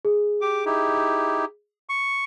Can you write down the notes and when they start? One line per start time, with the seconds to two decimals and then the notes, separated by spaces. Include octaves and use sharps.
0.05 G#4
0.41 G4 D6
0.66 D#4 E4 G4
1.89 C#6